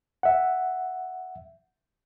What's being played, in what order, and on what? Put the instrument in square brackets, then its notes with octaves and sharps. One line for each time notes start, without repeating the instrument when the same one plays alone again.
[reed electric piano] E5 F#5